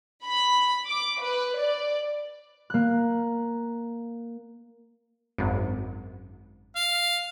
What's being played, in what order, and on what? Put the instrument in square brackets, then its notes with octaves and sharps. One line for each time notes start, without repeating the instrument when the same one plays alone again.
[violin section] B5
D6
B4
D5
[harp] A#3 F#6
[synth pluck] G#1 F#2
[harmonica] F5